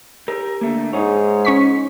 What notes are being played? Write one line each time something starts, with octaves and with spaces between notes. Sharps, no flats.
G4 A#4
D3 A3 A#3
G#2 D#4 G#4 C#5
C#4 C#6 B6